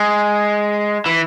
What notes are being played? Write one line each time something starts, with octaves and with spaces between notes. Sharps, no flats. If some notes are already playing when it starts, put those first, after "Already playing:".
Already playing: G#3
E3